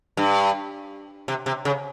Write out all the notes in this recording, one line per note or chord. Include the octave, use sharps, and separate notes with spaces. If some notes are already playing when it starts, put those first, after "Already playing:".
G2
C3
C3
C#3